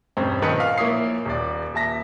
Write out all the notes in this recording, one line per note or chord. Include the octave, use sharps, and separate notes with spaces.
E1 G2 C4 C#4 C5
A#1 D#3 B4 A5 B5 C#7
D#5 F5
A#1 A#3 E4 C#5 D#6 C7
D#1 D#2 D5
D#1 E5 A5 A#6 B6